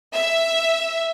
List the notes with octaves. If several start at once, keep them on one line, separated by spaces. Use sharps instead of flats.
E5